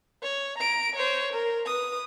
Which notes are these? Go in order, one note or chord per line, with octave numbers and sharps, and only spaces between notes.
C#5
A#5 D7
C5 C#5
A#4
B4 D#6